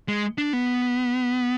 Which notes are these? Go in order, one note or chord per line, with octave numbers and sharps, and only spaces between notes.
G#3
D4
B3